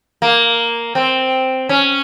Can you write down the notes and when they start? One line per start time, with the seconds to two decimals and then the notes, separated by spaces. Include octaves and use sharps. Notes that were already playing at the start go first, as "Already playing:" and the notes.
0.22 A#3
0.95 C4
1.69 C#4